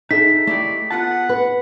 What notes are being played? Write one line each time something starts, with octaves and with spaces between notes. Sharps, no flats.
D#4 G#4 A4 E5 B6
A3 D#4 E4 G4 D5
B3 F4 F#5 A5
B4